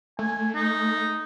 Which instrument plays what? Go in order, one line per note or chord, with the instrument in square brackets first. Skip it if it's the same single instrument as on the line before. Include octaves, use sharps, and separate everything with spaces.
[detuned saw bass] A3 [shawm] G#5
[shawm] D#4